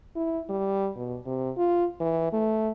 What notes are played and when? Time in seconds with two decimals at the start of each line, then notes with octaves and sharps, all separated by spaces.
0.16 E4
0.49 G3
0.96 B2
1.26 C3
1.57 F4
2.00 E3
2.33 A3